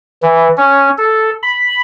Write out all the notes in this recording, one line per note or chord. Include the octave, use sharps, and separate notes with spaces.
E3
C#4
A4
B5